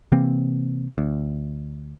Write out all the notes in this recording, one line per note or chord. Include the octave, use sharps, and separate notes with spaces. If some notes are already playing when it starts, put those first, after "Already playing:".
C3 E3 A#3 C4
D2